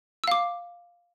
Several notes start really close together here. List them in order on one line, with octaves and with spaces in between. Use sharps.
E6 F5 D6